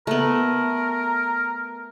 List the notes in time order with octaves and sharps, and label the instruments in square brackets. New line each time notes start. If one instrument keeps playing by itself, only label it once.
[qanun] A3 B3 [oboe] A#4